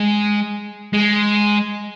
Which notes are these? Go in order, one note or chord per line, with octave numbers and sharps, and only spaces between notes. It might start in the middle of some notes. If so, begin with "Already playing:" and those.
Already playing: G#3
G#3